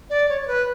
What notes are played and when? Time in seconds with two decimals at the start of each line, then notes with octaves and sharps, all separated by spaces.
0.10 D5
0.29 C#5
0.41 C#5
0.47 B4